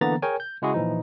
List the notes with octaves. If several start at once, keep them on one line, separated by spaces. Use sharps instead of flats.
D3 E3 A#3 B3 A#5 A6
G#4 A#4 C#5 G5 G#5
G6
C#3 G#3 E4 F#4 G#4
A#2 E3 F3 D#4